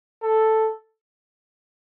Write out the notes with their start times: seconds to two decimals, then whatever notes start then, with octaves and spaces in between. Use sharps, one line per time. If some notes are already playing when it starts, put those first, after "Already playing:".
0.23 A4